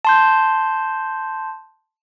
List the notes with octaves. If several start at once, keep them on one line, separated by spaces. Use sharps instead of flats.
A5 C6 G6